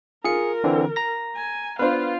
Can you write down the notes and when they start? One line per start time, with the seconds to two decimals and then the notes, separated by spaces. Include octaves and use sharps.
0.25 F4 G#4 A#4 C#7
0.64 D3 E3 C4
0.96 A#5 A#6
1.36 G#5
1.79 B3 D4 F4 B4 C5 F5